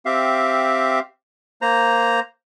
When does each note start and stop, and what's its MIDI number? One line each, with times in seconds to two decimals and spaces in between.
0.06 0.99 60
0.06 0.99 67
0.06 0.99 76
0.06 0.99 77
1.62 2.20 58
1.62 2.20 72
1.62 2.20 82